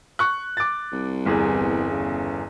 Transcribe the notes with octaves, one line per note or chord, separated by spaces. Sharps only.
C#6 F#6
D6 A6
C2
G1 E2 G#4
C#3